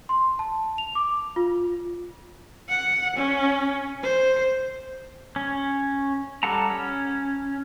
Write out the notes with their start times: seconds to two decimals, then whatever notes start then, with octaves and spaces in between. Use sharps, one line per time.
0.09 C6
0.39 A5
0.78 F7
0.95 D6
1.36 F4
2.69 F#5
3.16 C#4
4.03 C5
5.36 C#4
6.43 G3 A4 F#5 A5 A#5
6.70 C#4